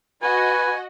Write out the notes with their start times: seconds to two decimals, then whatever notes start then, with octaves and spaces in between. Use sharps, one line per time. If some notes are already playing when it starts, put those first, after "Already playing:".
0.23 F#4 B4 D#5 G#5